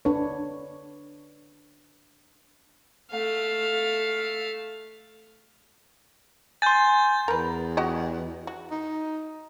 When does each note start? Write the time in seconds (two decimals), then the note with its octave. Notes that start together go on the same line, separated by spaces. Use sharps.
0.05 D4 B4 C#5
3.10 A3 F5
6.62 G#5 C6 G6 A6
7.28 E2 A#4 B4
7.77 F#4 G4 D#5
8.47 F#4
8.71 D#4